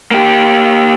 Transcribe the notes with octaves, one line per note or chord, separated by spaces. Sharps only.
A#3 G4